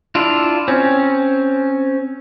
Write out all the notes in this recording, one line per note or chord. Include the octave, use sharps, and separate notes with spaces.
D4 E4 F4
C4 C#4